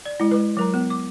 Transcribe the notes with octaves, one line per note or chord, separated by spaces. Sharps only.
D5
G#3 E4
G#3 B4
F#3 A#4 A#5
B3
D6